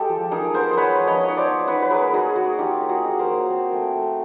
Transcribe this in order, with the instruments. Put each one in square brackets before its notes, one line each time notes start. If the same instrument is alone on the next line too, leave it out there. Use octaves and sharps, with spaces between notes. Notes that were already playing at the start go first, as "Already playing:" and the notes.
Already playing: [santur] G#3 G4 A4
F3
D#4 G#4 A#4
B3 A#4 C5
C5
G#3 B4 C#5
F3
C#5 D#5
D#4
C#5
C5 D5
B3
D#4 B4 C#5
B4
A#3 G#4 A#4
D#4 F#4 G#4
A#3 F#4
D#4 F4 G4
A#3
F#4 G#4
D#4
A#4 C5
A#3
C4
A3
A3